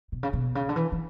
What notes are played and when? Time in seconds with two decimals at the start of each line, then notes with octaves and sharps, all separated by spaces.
0.12 B2
0.23 C#3
0.33 B2
0.55 C#3
0.69 D3
0.76 E3
0.92 E3